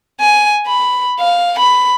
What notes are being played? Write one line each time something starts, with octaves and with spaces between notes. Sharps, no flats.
G#5
B5
F5
B5